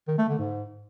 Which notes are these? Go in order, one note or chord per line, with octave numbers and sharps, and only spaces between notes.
D#3
A3
D3
G#2